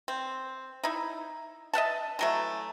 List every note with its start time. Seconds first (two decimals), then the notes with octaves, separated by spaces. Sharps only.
0.08 C4
0.84 D#4 E4
1.74 D#5 E5 F#5 A5
2.19 E3 F#3 A3